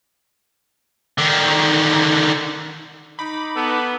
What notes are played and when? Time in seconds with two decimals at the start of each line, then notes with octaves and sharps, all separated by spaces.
1.18 D3 D#3
3.19 D#4 B5 D6
3.56 B3 A4